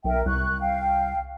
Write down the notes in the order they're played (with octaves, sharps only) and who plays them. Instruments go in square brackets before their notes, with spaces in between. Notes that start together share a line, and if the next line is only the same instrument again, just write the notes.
[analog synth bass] B1 [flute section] A#4 E5 G5
[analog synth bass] C2 [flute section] C#6 F#6
[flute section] F5 G5